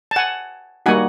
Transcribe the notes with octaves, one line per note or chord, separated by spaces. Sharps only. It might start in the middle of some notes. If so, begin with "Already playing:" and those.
A5
F#5 G#5
G3 A#3 D#4 F#4 F#5 G#5